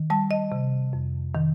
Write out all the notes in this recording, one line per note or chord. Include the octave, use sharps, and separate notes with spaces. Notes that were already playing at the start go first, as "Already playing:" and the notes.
Already playing: D#3
G3 A5
D#5
C3
F2
D#3